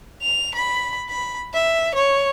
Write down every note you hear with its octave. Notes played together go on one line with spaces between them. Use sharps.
F7
B5
B5
E5
C#5